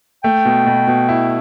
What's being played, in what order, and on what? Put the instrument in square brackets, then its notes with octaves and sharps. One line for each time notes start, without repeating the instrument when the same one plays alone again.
[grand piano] A3 [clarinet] G5
[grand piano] B2
B2
B2
E4